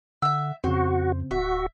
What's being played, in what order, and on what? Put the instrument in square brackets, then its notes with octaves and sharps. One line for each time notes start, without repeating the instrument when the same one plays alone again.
[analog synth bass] D3 [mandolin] E5 E6 [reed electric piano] F#5
[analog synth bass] F2 [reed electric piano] C#3 C4 [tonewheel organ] F#4 [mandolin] C5
[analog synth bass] D1 [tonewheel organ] F#4 [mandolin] E5